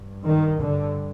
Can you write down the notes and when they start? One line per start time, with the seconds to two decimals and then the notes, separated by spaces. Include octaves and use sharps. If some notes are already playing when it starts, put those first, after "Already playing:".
Already playing: G2
0.27 D#3
0.61 G2 D3